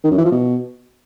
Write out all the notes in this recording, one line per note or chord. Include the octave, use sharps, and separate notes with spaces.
D#3
F#2
E3
F3
B2